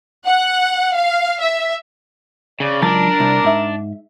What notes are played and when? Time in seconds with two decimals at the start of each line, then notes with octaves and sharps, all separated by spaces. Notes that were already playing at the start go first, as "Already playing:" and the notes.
0.24 F#5
0.94 F5
1.40 E5
2.60 C#3 D5
2.82 C#2 F#3 D4 A#4 A5
3.20 C2
3.44 G#2 E5